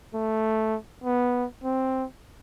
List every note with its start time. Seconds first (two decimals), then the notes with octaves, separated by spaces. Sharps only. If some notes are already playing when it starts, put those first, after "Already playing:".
0.14 A3
1.04 B3
1.64 C4